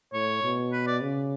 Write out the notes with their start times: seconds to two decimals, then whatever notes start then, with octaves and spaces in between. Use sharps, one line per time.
0.13 A2 C#5
0.43 B2
0.73 B4
0.87 D5
1.01 C#3